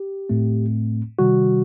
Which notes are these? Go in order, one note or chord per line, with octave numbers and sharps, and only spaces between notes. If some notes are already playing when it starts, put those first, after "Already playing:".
Already playing: G4
A2 A3 C4
C3 D#3 G3 F#4